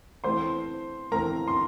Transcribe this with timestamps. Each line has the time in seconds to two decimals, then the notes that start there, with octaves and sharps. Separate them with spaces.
0.24 E3 A3 C4 C5 C6
1.12 E3 A3 C4 A#4 A#5
1.48 C6